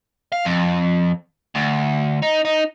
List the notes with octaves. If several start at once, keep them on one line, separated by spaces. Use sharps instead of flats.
F5
F2
D2
D#4
D#4